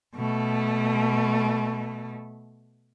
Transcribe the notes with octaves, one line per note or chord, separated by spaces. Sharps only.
B2 A3